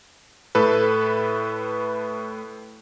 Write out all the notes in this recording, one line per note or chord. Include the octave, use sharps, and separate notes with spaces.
A2 A4 B4